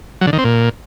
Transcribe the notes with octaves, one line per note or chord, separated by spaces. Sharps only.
F#3
D3
D#3
C4
A#2